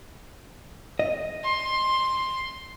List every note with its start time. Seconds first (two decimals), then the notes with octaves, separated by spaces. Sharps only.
0.99 D#5
1.44 C6